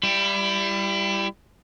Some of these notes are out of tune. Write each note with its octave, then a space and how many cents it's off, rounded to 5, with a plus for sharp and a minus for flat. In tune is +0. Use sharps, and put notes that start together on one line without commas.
G3 +5 E4 +30